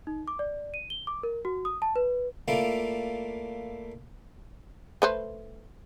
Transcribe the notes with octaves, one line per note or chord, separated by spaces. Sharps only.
D#4
D6
D5
D#7
G7
D6
A#4
F#4
D#6
A5
B4
A3 A#3 E4 F4 D5
A3 B4 C5